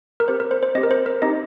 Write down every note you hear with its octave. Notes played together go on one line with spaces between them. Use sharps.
A#4
C4 G4 C5
A#4
C5
C5
C4 G4 D#5
A#4
C5
A#4
C4 D#4 G4 D#5